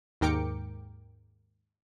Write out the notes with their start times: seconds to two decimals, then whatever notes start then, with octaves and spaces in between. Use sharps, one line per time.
0.21 D#2 G#2 A#4 G5 D6 C#7